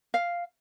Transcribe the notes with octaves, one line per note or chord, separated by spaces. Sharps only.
F5